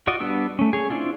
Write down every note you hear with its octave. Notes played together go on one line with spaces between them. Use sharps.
F4 F#4 D5 D#5
G3 B3 D4 E6
A3 C#4
G#4 C#5
C4 D4 E4 F4